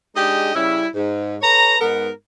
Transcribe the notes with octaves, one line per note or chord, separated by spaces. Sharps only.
G#3 D4 D#4 G4 G#4 D#5
C#3 G3 C#4 E4
G#2
A4 B4 C#5 A#5
G#2 B3 A#4